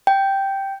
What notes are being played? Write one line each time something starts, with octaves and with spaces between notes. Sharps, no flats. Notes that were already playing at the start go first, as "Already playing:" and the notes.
G5